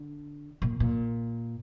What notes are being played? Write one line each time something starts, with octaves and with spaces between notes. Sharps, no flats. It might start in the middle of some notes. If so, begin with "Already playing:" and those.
Already playing: D3
A#2
A#2